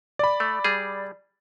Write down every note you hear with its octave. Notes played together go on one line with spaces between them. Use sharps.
D5 B5
A3
G3 G#4